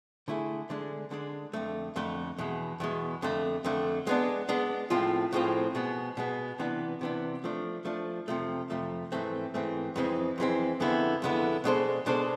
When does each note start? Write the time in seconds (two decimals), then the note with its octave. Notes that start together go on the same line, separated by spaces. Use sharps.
0.28 D3 A3 E4 G#4
0.70 D3 G#3 D4
1.11 D3 G#3 D4
1.53 F2 D3 A3
1.96 F2 D3 A3
2.38 E2 B2 G#3
2.80 E2 B2 G#3
3.22 F2 D3 A3
3.65 F2 D3 A3
4.07 G#3 B3 D4
4.49 G#3 B3 D4
4.90 A2 F3 G#3 C4 F4
5.33 A2 F3 G#3 C4 F4
5.75 B2 G#3 B3
6.17 B2 G#3 B3
6.59 C3 E3 B3 D4
7.01 C3 E3 B3 D4
7.44 F3 A3 D4
7.85 F3 A3 D4
8.28 F2 C3 F3 A3
8.70 F2 C3 F3 A3
9.12 G#2 E3 A3 C4
9.54 G#2 E3 A3 C4
9.96 F2 E3 G#3 C4
10.38 F2 E3 G#3 C4
10.80 F2 D3 G#3 B3 E4
11.22 F2 D3 G#3 B3 E4
11.64 B2 G#3 D4 A4 C5
12.06 B2 G#3 D4 A4 C5